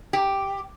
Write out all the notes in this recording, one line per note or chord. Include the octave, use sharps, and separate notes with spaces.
G4